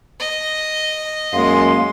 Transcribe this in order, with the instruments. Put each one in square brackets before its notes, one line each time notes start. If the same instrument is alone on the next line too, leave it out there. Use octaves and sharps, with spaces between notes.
[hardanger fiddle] D#5
[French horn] F#2 [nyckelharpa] G#3 C6 [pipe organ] A#3